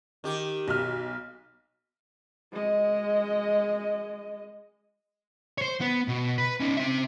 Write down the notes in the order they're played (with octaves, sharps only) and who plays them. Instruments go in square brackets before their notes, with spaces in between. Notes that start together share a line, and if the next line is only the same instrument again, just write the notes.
[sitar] D#3 G4
[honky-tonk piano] B1 F6
[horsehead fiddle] G#3 D#5
[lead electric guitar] C5 C#5
B3
B2
B4
C#4 D#4
C4 E5